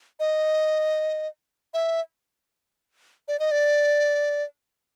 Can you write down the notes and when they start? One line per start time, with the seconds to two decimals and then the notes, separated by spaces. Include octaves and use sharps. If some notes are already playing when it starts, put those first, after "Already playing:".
0.20 D#5
1.74 E5
3.28 D5
3.39 D#5
3.51 D5